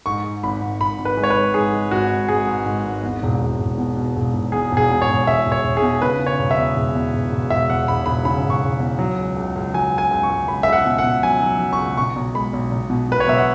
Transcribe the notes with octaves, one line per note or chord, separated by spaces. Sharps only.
G#2 C#6
G#2
G#1 B5
G#1
G#1 B5
G#1
B4
G#3
C#5
B4
G#3
G#2 G#4
G#3
G#1 F#4
G#1
G#1 G#4
G#2
G#2
G#1
E2
E1
E1
E1
B2
B2
E1
E1
E2 G#4
E1
G#4
B2
C#5
E1
E1 E5
E1
C#5
E1
G#4
B2
C#3 B4
C#3
C#5
E1
E5
E2
E1
E2
E1
E1
E1 E5
E2 F#5
E1 B5
E1 B5
C#3 B5
E1
C#6
E1
E2
F#3
C#2
C#2
C#2
F#3 G#5
C#2
G#5
C#2
C#6
C#2
C#2 B5
C#2 E5
F#5
B2
F#5
B2
F#3 G#5
F#3
F#3
C#6
C#2
B1 C#6
B1
G#3 B5
B1
B1
B2
B2 B4
C#5
B1 E5
F#5